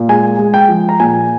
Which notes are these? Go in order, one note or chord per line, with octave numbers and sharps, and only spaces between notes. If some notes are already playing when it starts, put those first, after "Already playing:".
Already playing: A#2
G#3 G#5
G#3
G5
F3
A#5
A#2 G#5